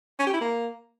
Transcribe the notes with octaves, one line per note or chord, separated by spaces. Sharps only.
C#4
G4
E4
A#3